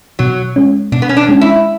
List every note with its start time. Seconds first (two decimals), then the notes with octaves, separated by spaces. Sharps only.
0.19 B2 F#3
0.56 G#3 C#4
0.92 B2 D4
1.02 B3
1.09 C#4
1.17 D4
1.29 G#3 C#4
1.41 E4